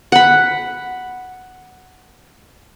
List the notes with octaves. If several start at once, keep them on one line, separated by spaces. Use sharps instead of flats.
F#5 B5